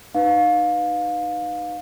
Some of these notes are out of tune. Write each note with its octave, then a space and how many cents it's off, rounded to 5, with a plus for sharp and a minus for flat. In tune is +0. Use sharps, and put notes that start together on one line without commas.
D#4 -20 B4 +0 F5 +25